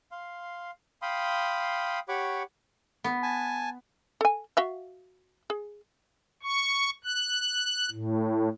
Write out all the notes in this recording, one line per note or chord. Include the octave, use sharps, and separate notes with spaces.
F5 C6
F5 G5 B5 C6 D#6
G4 C#5 F#5 B5 C#6 D6
B3
G#5 A5
A4 G#5
F#4 E5 F5
G#4
C#6
F#6
A2